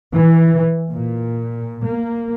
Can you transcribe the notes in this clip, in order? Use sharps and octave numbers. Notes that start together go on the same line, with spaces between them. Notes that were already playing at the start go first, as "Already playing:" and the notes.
E3
A#2
A#3